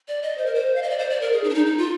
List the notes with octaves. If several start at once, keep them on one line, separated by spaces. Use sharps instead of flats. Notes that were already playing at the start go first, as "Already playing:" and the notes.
D5
D#5
C5
A#4
C5
F5
D#5
D5
C5
D5
A#4
G#4
D#4
D4
D#4
D#4
F4